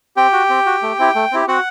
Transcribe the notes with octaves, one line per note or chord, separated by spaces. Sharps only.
C4 G4 G5
F#4
C4
F#4
A3
C4 E4 G4
A3
C4 E4 G4
C4 F#4 F#5